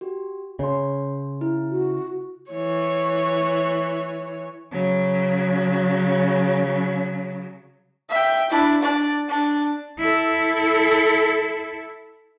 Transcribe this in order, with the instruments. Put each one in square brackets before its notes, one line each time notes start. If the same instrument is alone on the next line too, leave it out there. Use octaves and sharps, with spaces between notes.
[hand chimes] F#4 G4
[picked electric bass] C#3 [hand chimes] C#5 C6
[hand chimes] E4
[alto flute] F#4
[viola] E3 C#5
[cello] C#3 F#3
[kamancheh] E5 G5
D4 E4
D4 D5
D4
[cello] E4 A4